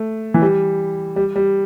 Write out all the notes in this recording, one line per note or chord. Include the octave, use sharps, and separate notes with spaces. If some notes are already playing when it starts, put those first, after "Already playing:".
Already playing: A3
E3
G3
G3
G3